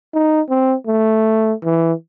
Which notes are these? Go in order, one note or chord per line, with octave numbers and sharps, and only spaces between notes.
D#4
C4
A3
E3